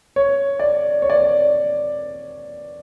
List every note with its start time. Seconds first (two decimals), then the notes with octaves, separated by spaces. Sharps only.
0.16 C#5
0.59 D5
1.02 C#5
1.10 D5
1.17 C#5